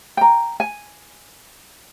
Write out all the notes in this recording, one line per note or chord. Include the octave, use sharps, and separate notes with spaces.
G5 A#5
G#5